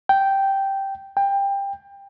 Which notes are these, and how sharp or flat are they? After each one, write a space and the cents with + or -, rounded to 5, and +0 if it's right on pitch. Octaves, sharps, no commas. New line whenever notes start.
G5 -5
G5 +20